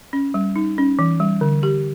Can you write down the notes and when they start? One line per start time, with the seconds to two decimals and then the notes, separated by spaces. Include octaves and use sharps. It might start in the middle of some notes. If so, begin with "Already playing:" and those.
0.13 C#4
0.34 G3
0.56 D#4
0.78 C#4
0.99 E3
1.20 G3
1.41 D3
1.63 G4